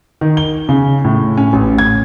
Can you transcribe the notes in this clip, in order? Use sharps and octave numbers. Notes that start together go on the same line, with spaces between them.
D#3
G7
C#3
A2
C#4
A1
G#6